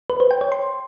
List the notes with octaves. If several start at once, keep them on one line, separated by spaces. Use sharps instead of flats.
B4
C5
G5
C#5
C6